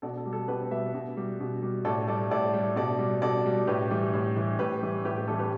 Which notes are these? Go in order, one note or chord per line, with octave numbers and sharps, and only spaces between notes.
B2 A4 D5
A4
G3
A4
B2 G4 B4
G3 B4 E5
B2
G3
B2
G3
A2 A4 D5
G3 A4 D5
A2 A4 D5
G3
B2 A4 D5
G3
B2 A4 D5
G3
A2 G4 B4
E3 G3
A2
E3 G3
A2 G4 B4
E3 G3
A2 G4 B4
G4
E3 G3 A4
G4 B4